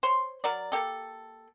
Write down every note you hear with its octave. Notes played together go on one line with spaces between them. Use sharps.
C5 C#5 C6
F#3 A#4 D5
A#3 G4 A4